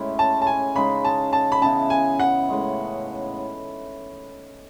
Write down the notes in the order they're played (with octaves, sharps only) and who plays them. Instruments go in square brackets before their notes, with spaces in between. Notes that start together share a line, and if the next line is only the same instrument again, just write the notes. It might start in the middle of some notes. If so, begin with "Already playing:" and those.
Already playing: [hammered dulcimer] A2 G#3 C#4 E4
[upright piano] A5
A5
G#5
[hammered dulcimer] C#3 G#3 D#4 G#4 [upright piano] B5
[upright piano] A5
A5
B5
[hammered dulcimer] C#3 E3 B3 E4 [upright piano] A5
[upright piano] G#5
F#5
[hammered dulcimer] A2 G#3 C#4